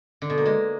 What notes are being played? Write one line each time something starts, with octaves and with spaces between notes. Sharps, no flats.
D3
B2
A#3
G#3